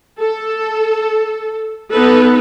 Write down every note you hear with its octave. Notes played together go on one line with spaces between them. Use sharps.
A4
B3 D#4 A4 B4